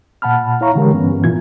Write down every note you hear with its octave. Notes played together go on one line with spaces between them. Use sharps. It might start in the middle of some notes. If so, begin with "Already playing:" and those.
A#2 F#5 A5 B5 F6
E4 C#5 F5 A#5 C#6
D3 E3 G#3 G4 A#4
G2 E3 B3 C#4
A#2 E3 F4 G#6